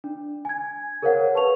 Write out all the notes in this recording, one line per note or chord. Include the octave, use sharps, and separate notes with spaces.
D4
G#5 G#6
G#4 A#4 C5 C#5 F5 F#5
B4 A5 C#6 F7